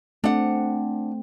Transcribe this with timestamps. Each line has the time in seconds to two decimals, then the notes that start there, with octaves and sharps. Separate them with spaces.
0.24 A3 C4 D4 F#5